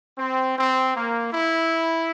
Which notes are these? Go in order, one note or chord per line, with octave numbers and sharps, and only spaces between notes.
C4
C4
A#3
E4